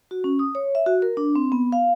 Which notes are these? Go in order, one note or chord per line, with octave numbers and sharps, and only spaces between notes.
F#4
C#4
D#6
C#5
E5
F#4
A#4
D4
C4
B3
F5